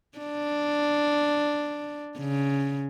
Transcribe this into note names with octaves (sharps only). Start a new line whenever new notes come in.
D4
C#3